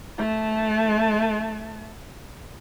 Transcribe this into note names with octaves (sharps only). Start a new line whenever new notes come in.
A3 A5